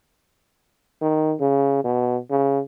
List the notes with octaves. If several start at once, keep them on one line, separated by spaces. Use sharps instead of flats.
D#3
C#3
B2
C#3